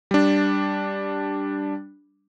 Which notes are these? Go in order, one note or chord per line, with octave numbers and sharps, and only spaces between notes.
G3 D4